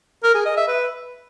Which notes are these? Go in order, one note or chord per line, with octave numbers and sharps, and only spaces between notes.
A#4
G#4
D#5
E5
B4